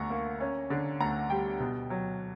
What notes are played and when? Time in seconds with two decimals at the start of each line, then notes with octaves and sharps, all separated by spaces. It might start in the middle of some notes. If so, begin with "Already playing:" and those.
Already playing: D2 D3 A#5 C#6
0.10 A#3
0.40 C#4
0.70 D3
1.00 D2 F#5 A#5
1.30 G3 G5
1.60 B2
1.90 F#3